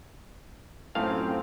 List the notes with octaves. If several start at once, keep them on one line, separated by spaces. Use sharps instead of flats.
F#2 A2 C4 F4 F5